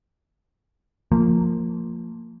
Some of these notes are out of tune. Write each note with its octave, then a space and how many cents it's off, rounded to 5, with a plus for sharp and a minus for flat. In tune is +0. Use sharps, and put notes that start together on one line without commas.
F3 +0 A#3 -25